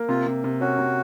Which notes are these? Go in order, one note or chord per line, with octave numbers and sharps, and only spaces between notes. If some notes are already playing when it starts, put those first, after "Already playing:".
Already playing: A#3
C3 F4
C3
C3
C#4 F#4
C3